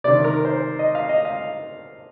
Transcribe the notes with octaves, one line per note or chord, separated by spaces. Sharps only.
C3 D#3 D5
A#4
C5
D#5
F5
D#5
F5